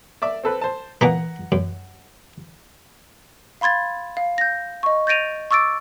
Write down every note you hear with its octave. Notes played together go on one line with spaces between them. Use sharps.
D5 E5 D6
C4 A4 B4
C5 A5
A#2 E3 B3 F#5 A#5
F#2
F5 B5 C6 G#6 A6
F5
G6 A#6
D#5 C#6
G6 A6 A#6 D7 D#7 F7
C#6 D6 E6 A6 D7